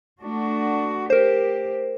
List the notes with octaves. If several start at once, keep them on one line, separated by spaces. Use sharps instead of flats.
A3 D4 F#4
G4 A#4 C5